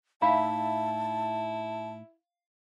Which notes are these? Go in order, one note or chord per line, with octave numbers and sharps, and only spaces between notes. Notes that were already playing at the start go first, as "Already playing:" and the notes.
A2 D#4 E4 E5 F5 A5 B5